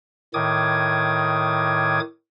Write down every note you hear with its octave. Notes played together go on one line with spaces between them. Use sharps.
A2 D#3 D6 D#6 G#6